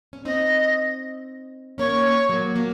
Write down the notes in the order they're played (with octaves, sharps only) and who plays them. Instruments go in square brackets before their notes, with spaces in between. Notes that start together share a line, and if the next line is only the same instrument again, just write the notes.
[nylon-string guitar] C#4
[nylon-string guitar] C4 D#4 [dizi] D#5
[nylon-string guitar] A#3 C#4 [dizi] C#5
[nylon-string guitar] F#3 A#3
F#3 A#3